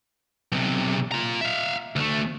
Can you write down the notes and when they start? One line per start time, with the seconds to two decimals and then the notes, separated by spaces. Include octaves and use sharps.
0.52 B1 C3
1.12 F4 A#5
1.41 E5 F5
1.96 D2 A3